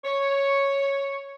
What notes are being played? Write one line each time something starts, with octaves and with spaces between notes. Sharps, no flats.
C#5